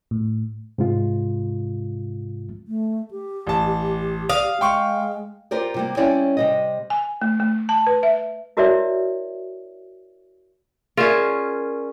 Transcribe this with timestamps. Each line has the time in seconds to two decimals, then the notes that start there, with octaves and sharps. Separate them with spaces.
0.11 A2
0.78 G#2 C3 G#3 F4
2.68 A3
3.11 G4
3.47 A1 A5
4.29 F5 D#6
4.61 G#3 G5 C6 C#6
5.51 F4 G4 A#4 C5 D5
5.74 C3 G3 A#3
5.97 G3 C4 C#4 E4 C#5 D5
6.37 C3 G3 D#5
6.90 G#5
7.22 A3
7.40 A3
7.69 A5
7.87 B4
8.03 E5
8.57 E4 F#4 A#4 C#5 D5 E5
10.98 C#4 F4 G#4 A#4 D5